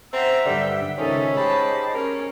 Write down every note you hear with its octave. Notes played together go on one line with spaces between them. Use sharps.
C4 E5 F#5 A#5 E6
G2 D3 G3 G5
C#2 D#3 C#4 D#4 A4 C5 E5 G#5
G#3 D#4 G4 C5 A5 B5
C#4 A#4